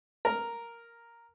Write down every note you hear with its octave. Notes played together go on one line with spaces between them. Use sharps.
A#4 A#5